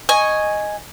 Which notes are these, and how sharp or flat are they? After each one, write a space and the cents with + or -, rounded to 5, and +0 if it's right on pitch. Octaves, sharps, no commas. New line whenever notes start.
D#5 +0 G#5 +0 C#6 +0